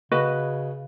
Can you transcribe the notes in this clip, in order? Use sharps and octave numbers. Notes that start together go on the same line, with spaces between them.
C#3 F#4 B4 D#5